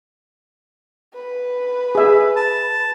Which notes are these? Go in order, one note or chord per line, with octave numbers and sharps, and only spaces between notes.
B4
G#4 E5
A5